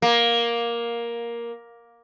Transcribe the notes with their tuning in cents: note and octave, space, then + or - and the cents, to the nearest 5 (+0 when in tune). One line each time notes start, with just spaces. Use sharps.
A#3 +10